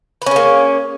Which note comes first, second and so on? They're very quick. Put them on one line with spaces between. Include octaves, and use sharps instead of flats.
B4 C#4 G#4 A#3